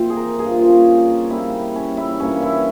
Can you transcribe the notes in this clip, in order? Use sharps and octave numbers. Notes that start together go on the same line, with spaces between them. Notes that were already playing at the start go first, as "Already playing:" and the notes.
Already playing: A#2 F3 C4 C5 E5
G#4
A#4
G2 F3 A#3 G#4
F4
C#4
C3 G3 A#3 E4
C#4
E4
G2 E3 A#3 C#4
E4